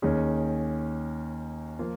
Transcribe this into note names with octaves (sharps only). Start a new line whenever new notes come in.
D#2 D#3 C#4 G#4
F3 A#3 F4